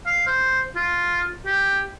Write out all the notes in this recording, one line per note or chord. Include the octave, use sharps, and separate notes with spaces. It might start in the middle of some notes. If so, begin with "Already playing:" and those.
F5
C5
F4
G4